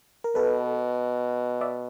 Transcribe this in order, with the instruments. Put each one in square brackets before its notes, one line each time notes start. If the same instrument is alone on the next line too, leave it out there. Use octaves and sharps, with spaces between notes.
[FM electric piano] A#4
[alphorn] B2 [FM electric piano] A4 B4
[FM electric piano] D5 E5